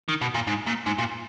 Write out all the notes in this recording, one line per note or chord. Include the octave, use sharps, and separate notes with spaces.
D#3
B2
A#2
G#2
A#2
G#2
A#2